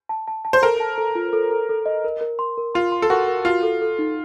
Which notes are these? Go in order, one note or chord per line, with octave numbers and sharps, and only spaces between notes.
A5
A5
A5
C5
A4 A#4
A5
A4
F4
A4
A4
A4
D#5
A#4
A#4
C6
A#4
F4 C6
C6
A4
F#4 A#4
A#4
F4 F#4
A4
A4
D#4